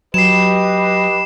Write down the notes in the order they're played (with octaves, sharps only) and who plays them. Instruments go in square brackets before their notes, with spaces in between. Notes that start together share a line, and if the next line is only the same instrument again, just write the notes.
[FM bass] F#3 [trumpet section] G4 B4 D#5 [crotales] C7 E7